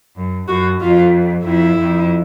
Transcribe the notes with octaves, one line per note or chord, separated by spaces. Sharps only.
F#2
F#2 F#4
F2 F4
F2 E4
F2